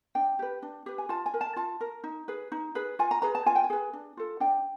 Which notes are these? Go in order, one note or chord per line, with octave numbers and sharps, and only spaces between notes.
D4 G5
G4 B4
D4
G4 B4
G#5
F4 A5
G#5
A#4
A5
F4 A5
A#4
D#4
G#4 B4
D#4
G#4 B4
F4 G#5
A#5
G#4 B4 A#5
A5
F4 G#5
G5
G#5
G#4 B4
D4
F4 A4
D4 G5